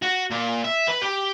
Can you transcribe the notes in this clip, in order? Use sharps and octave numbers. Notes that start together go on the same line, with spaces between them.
F#4
A#2
E5
B4
G4